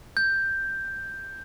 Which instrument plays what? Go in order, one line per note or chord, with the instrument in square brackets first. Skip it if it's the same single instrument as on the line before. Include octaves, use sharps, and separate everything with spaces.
[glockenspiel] G6